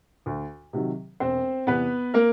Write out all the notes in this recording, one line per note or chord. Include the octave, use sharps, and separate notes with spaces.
D2
C3 D#3 F#3
E1 C4 C5
E2 C3 B3 B4
A#3 A#4